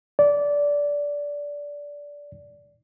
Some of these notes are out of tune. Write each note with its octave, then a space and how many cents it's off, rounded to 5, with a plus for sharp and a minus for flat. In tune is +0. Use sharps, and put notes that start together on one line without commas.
D5 -15